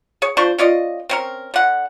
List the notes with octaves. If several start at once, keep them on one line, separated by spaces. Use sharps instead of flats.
G#4 C#5
F3 D4 C5 C#6
C#4 F4 D5 D#5
C4 C#4 A#4
D3 F#5